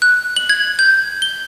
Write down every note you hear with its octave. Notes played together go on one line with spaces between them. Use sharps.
F#6
F#7
G#6
G6
G7